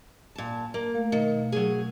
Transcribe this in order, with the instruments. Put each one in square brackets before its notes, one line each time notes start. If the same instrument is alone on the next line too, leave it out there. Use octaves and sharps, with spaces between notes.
[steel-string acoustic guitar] A#2 A5
A#3
[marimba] A3 A#4 F5
[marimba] B2 [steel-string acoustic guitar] D#3
[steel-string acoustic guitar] F#3 C#4 G#4